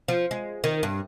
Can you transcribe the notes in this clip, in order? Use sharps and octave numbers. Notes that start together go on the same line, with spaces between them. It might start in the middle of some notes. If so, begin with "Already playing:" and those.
F3
G#3
D#3
G2